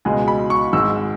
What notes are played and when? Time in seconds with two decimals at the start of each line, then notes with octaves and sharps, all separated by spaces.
0.05 C#2 B2 G#3 G#5
0.28 B5
0.50 C#6
0.73 G#1 G#2 G#3 E6